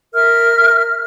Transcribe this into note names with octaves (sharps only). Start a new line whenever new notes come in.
A#4 E5 F6